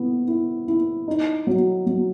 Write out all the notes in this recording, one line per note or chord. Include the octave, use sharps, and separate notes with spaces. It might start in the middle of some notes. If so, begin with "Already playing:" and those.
Already playing: B3 E4
E4
E4
D#4
F#3
F#3